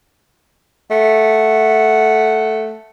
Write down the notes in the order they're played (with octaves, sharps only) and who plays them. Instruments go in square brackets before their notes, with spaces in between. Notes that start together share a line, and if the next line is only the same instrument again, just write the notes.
[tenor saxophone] A3 [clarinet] F#5